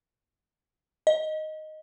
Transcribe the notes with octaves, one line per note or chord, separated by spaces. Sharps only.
D#5